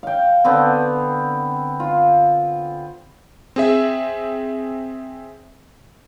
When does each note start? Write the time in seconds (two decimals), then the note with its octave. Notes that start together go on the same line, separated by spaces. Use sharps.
0.03 F5 G5
0.44 D3 B3 C4
1.80 F4
3.56 C4 G#4 E5